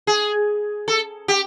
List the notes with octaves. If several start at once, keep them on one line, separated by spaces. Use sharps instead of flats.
G#4
A4
G4